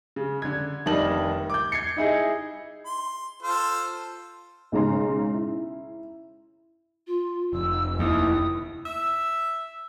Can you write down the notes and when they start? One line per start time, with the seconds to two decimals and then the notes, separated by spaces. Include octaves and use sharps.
0.16 C#3
0.42 D3 G#6
0.86 F1 D#3 G3 D#5 A5 F#7
1.50 D6 G6
1.72 G#6 C7 C#7
1.97 D#4 E4 G#4 D#5
2.85 C6
3.42 F4 A4 C5
4.72 B1 G#2 C#3 A#5 C6
5.34 E4
7.07 F4
7.53 F1 E6
7.99 D#2 E4 D#6
8.85 E5